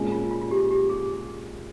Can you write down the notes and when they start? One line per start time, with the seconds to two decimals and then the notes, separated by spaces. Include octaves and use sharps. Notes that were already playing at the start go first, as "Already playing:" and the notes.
Already playing: A#2 G#3 C#4
0.12 F4
0.31 F4
0.41 F4
0.51 G4
0.71 G4
0.89 G#4